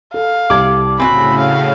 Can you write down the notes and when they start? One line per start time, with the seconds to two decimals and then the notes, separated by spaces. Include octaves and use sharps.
0.14 A4 F5
0.50 C2 G4 A4 D5 D6 G#6
1.00 A2 C#3 C4 D4 F#4 G#5 B5
1.40 F5